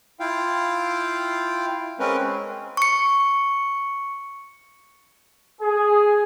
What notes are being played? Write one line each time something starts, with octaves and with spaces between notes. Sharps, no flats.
E4 F4 F5 G5
G#3 C4 C#4 A#4 B4
C#6 C#7
G#4